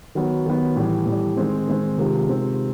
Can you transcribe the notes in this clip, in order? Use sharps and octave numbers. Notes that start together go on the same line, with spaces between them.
D#3 F#3 B3
D#3 F#3 B3
A2 E3 G3
A2 E3 G3
D#3 G#3 C4
D#3 G#3 C4
C3 D#3 G#3 C4 F4
C3 D#3 G#3 C4 F4